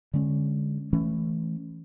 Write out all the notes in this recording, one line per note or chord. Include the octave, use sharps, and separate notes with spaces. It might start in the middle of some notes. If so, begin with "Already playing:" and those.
D3 G#3 C#4
E3 A3 C#4